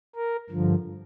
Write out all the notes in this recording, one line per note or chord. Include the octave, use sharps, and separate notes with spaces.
A#4
G2 D3 F3